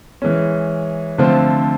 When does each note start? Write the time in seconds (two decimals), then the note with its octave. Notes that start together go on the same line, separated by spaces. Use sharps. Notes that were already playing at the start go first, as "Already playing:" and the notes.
0.22 E3 G#3 C#4
1.18 D3 F3 A3 C4 F4